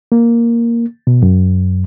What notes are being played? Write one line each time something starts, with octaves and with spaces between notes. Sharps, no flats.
A#3
B2
F#2